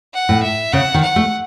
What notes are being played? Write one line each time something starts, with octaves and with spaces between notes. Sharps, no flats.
F#5
A2
E5
C#3 F#5
D#3
F#5
A3